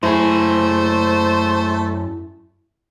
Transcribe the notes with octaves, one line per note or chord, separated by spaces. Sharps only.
F#2 A3 E4 G#4 C5